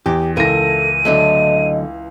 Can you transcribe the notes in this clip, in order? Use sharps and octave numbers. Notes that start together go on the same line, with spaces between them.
E2 G4
C#2 E3 A4 A#4 A#6 D#7
D3 F#3 A3 D#5